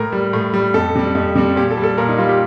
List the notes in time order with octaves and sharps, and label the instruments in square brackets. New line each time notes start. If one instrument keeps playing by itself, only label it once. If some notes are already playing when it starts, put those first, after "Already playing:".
Already playing: [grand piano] A2 A#4
G3
A2
G3
F2 A4
C3 G3
F2
C3 G3
A#2 G4
A4
G3
A4
A#2 A#4
D#4
G3 F4
G4